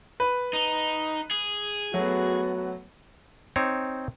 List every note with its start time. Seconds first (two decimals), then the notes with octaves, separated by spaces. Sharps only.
0.20 B4
0.53 D#4
1.31 G#4
1.94 F#3 A3 B3 F#4
3.56 C4 D#4 C#5